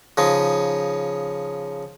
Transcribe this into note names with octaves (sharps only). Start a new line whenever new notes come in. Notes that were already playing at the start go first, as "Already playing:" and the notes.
C#3 F3 D#4